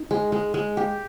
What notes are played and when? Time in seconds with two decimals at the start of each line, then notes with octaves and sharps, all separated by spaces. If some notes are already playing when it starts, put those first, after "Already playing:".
Already playing: D#4
0.11 G#3
0.32 G#3
0.54 G#3
0.77 G4